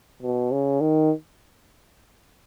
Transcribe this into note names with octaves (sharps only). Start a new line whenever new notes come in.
B2
C#3
D#3